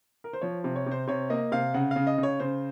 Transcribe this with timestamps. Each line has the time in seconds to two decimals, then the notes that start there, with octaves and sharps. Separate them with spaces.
0.24 A#4
0.33 C5
0.41 F3 C#5
0.64 C3
0.76 C#5
0.86 C3
0.91 C5
1.07 C3 C#5
1.30 A#3 D#5
1.52 C3 F5
1.74 C#3 F#5
1.91 C#3 F5
2.07 D#5
2.18 C#3
2.23 C#5
2.40 C#3 C5